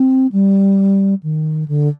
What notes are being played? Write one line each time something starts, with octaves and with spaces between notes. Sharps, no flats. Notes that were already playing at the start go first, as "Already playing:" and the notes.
Already playing: C4
G3
D#3
D3